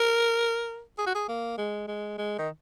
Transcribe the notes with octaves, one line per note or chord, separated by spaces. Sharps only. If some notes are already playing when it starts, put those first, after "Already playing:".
Already playing: A#4
G#4
F#4
G#4
A#3
G#3
G#3
G#3
D#3